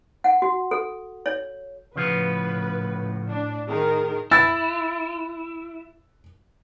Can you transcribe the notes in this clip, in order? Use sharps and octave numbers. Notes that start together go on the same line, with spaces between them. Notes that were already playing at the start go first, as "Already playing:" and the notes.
F#5
F#4
A4
C#5
A2 C#3 F3 B3 B4
D4
D#3 G#4 A#4
E4 E6 A6